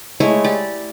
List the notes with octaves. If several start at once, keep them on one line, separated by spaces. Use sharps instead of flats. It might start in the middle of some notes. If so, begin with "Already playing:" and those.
G#3 A3 E4 C#5
G4 D5